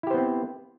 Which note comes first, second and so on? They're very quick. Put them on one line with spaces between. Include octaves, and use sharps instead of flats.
E4 G4 C5 B3 C4